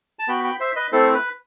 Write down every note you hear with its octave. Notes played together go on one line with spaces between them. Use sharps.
A5
B3 F#4 G5 B5
G5 B5
C5 E5
B4 D#5
A3 C4 E4 A4 C5
B4